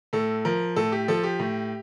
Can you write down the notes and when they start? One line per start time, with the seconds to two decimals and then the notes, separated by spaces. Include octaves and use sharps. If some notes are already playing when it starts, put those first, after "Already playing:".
0.13 A2 A4
0.45 F3 A#4
0.76 A2 A4
0.92 G4
1.08 F3 A4
1.23 G4
1.39 A2